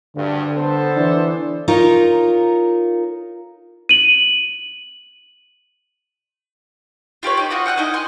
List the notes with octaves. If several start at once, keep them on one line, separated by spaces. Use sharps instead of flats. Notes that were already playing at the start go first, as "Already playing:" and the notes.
D2 G2 D3
B3 A4 C5
E3 D4
D#4 F4 A#4 C#5
D#7 F#7
F4 G4 B4 C#5
D#4 G4
F4 F#4 D#6
F#5 G5 F6 F#6
D#4 E4 D#5 G#5
G#5 C6 F#6